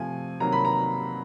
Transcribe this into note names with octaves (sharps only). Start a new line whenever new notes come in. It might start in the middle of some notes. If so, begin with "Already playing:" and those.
Already playing: C3 F3 A3 G#5
C3 D#3 F#3 A#3 A#5
B5
A#5